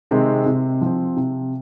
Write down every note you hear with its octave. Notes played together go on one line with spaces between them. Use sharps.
C3 D#3 G#3 C4
C3
F3 C4
C3